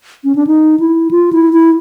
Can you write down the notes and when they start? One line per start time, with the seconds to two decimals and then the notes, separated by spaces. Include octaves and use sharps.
0.24 C#4
0.35 D4
0.47 D#4
0.80 E4
1.11 F4
1.33 E4
1.53 E4